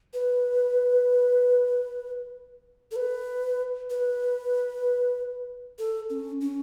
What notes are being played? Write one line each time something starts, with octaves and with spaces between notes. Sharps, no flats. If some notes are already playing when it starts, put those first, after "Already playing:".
B4
A4
B4
B4
A4
C#4
C#4